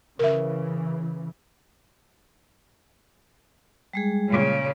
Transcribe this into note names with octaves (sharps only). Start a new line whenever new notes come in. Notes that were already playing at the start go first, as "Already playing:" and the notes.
C#3 E3 A#4 E5
G3 G#3 G#4
A#2 C#3